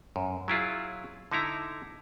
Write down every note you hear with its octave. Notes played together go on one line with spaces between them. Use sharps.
F#2
F#3 E4 F4 G#4
D3 D#4 E4 A#5